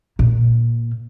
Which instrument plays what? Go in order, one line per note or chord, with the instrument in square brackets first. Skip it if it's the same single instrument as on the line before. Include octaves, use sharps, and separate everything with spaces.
[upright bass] A#2